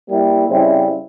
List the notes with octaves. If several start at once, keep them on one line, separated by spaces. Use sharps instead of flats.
G3 A#3 E4
C#3 G3 C4 E4